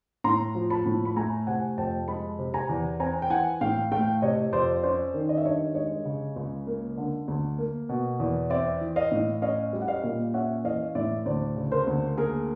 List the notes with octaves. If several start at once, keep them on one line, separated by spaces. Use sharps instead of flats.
A2 A#5 C6
F3
A5 B5
A2
B5
A3 G#5 A#5
C3 F#5 G#5
F2 G5 A5
G#3 A5 B5
C3
G#5 A#5
E2
C4 G#5 A#5
G5
E3 F#5 G#5
A2 F5 G5
A3 F5 G5
C3 C#5 D#5
F2 C5 D5
C#4 C5 D5
D#3
D#5
E5
G2 C#5 D#5
G#3 C#5 D#5
C#3
C#2
A#3
D3
D2
A#3
B2
E2
C4 D5 E5
E3
D#5 F5
A2
C#4 D#5 F5
G3
F#5
D#5 F5
A#2
C#4 E5 F#5
E3 D#5 F5
A2 D5 E5
D2 C5 D5
C#3
A#4 C5
D2
A#3 G#4 A#4